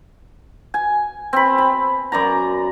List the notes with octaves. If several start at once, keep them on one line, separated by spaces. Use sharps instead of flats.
G#5
C4 B5
B5
F#2 D5 A#5